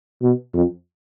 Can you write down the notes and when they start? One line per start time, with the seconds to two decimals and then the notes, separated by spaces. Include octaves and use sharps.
0.22 B2
0.54 F2